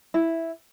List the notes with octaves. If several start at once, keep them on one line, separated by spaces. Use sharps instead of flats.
E4